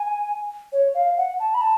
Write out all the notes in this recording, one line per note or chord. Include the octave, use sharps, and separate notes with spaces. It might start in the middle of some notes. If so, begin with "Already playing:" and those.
Already playing: G#5
C#5
F5
F#5
A5
B5
A5